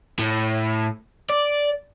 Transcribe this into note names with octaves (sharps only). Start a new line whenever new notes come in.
A2
D5